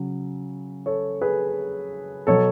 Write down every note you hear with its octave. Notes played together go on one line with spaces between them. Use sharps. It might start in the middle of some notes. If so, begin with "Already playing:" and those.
Already playing: C#3 F#3
A4 C#5
G#4 B4
B2 F#3 A4 C#5